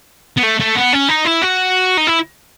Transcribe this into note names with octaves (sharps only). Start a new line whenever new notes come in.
B3
A3
A3
B3
C#4
D#4
E4
F#4
D#4
E4